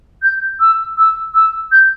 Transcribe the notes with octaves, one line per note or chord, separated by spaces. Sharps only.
G6
E6
E6
E6
G6